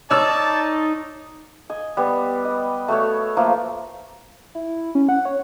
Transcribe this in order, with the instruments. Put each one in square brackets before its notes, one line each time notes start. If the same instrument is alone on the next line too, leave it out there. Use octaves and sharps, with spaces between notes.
[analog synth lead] D#4 [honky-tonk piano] C#5 E6 [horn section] D5 A5
[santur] D#5 G#5
G3 B3
D5 D#5
A3 F#4 A4 C#5
F3 A3 A#3 F4
[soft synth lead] E4
C#4
F#5
C#5